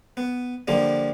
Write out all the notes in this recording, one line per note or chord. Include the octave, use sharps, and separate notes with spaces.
B3
D3 F3 G3 A#3